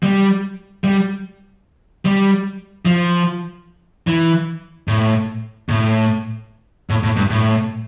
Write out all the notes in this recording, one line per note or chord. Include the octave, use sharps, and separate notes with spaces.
G3
G3
G3
F3
E3
A2
A2
A2
A2
G2
A2